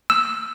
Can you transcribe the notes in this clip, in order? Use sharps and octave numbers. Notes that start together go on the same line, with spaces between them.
E6